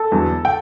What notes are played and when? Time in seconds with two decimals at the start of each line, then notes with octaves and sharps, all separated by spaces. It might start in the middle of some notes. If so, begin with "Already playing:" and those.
Already playing: A4 A5
0.12 E2 D3 F#3
0.45 G5